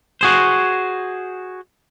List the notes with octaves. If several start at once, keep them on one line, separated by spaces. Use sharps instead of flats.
F#4 G#4 C5